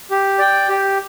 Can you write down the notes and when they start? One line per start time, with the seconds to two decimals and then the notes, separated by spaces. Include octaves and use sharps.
0.10 G4
0.39 D5 G5
0.69 G4